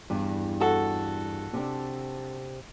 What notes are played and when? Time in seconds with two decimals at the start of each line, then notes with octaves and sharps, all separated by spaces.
0.10 E2 G2
0.60 F#4 A4
1.53 C3 C4 D4